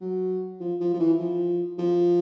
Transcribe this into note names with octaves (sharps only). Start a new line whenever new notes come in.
F#3
F3
F3
F3
E3
F3
F3